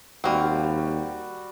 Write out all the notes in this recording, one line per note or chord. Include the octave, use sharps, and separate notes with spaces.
D#2 G3 A#3 C4 F#4